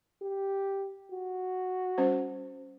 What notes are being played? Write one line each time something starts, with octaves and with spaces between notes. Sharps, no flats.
G4
F#4
G3 C#4 C5